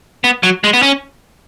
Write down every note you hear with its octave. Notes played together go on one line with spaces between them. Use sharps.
B3
F#3
G#3
B3
C#4